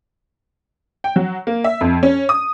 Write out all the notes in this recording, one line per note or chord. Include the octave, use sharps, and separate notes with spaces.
G5
F#3
A#3
E5
F2
C#4
D#6